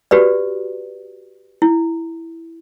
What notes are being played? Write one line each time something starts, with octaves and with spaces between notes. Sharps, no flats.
F#4 G4 B4 D5
E4